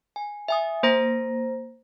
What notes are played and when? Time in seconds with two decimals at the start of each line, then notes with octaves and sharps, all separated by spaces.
0.16 G#5
0.48 E5 G#5 D#6
0.83 A#3 C5 A#5 A#6